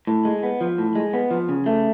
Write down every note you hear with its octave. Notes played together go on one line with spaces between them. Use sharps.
A2
G#3
B3
F3
A2
G#3
B3
F3
C#3
A3